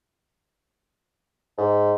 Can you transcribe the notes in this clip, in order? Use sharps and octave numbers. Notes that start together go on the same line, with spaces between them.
G#2